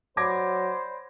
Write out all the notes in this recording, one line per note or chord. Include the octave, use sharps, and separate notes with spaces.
F#3 C5 D5 B5 D6 G#6 A#6